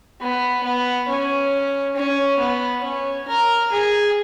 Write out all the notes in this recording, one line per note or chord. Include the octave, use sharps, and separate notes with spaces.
B3
B3
C#4
C#4
B3
C#4
A#4
G#4